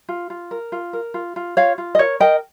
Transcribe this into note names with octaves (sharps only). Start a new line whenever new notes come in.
F4
F4
A#4
F4
A#4
F4
F4
F4 C#5 F5
F4
D#5
A#4 C#5
A#4 D#5 G5